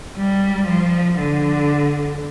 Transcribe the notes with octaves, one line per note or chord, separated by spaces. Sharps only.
G3
F3
D3